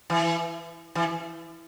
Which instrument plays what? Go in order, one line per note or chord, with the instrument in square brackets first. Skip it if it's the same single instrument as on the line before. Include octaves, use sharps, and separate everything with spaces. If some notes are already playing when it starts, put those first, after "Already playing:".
[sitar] E3
E3